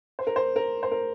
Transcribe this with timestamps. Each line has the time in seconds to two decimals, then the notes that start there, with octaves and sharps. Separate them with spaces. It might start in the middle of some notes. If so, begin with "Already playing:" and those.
0.19 C5
0.27 A#4
0.36 C5
0.56 A#4
0.83 C5
0.91 A#4